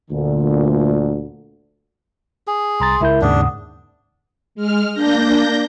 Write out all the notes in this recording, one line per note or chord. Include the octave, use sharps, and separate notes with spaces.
D2 A#2 D3
G#4
C2 A#5 C6 A6
C#2 E4 A#4 E5 G6
D#2 G#2 C#3 D4 F#5 D#6
G#3 F6
A#3 D4 G6 A#6